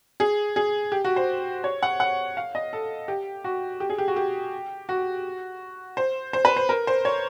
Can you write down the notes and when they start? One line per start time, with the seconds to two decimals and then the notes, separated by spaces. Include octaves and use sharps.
0.20 G#4
0.56 G#4
0.92 G4
1.05 F#4
1.16 C5
1.64 C#5
1.83 F#5
2.00 F#5
2.37 F5
2.55 D#5
2.73 A4
3.08 G4
3.44 F#4
3.80 G4
3.90 G#4
3.98 G4
4.08 F#4
4.16 G4
4.89 F#4
5.97 C5
6.33 C5
6.45 B4
6.56 C5
6.69 A#4
6.87 C5
7.05 C#5